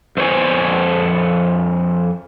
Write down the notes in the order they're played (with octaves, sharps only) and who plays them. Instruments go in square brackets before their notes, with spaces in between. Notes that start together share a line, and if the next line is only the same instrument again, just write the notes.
[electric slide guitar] F2 C5 C#5 G#5